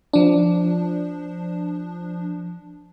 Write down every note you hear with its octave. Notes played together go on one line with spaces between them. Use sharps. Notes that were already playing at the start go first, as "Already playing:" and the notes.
F3 D4